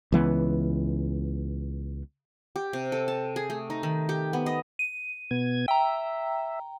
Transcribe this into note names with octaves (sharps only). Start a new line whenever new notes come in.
C#2 E3 B3
G4
C3
A4
A5
G#4
A3
D#4
D#3
G4
B3
D#5
D#7
B2 B3 G#6
E5 G5 A#5